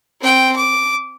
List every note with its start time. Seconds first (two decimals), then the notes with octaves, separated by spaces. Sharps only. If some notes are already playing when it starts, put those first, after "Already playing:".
0.21 C4 G5
0.56 D6